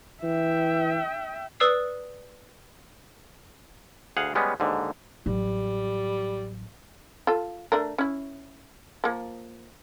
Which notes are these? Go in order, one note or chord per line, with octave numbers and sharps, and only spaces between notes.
E3 E5 G5
B4 D5 D#6 E6 C7
D2 G#4 F5 F#5
G3 G#3 B3 C#4
D#2 G#2 D3
A1 F#3 G3
F4 A4
A3 D4 A#4
C#4 E4
F3 A#3